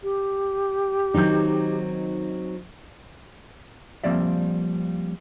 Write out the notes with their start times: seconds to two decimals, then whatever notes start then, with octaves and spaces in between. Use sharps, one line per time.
0.03 G4
1.14 D#3 F#3 C4 D#4 G6
4.04 F3 G3 A#3 C4 D5 E5